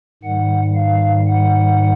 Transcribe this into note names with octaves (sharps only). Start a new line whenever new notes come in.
G#2 D#3 G3 F#5
F5
F#5